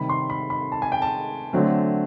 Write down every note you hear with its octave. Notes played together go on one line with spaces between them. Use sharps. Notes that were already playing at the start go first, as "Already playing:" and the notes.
Already playing: C3 D#3 G3 B5
C6
B5
B5
A5
G#5
G5
A5
D3 F#3 A3 C4